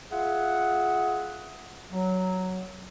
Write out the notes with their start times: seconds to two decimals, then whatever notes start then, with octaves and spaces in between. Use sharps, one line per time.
0.11 F4 G#4 E5 F#5
1.91 F#3